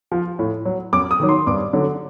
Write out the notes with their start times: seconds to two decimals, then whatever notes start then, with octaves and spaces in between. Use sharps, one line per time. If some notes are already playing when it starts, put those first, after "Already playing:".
0.12 F3
0.39 A2
0.65 F#3
0.93 F#2 D6
1.11 D#6
1.20 D#3 F#3
1.29 C6
1.47 G2 D6
1.73 D3 F#3